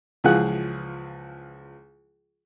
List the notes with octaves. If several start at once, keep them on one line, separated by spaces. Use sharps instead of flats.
C#2 E3 F3 G#4 F#5 F#6